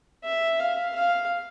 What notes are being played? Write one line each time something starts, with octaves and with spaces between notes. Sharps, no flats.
E5
F5
F5